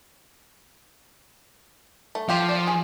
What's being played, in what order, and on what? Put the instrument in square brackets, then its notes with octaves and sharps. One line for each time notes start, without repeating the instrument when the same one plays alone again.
[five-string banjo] A3
[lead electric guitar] F3 [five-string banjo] F4 G4 F5
[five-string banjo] D5
G#4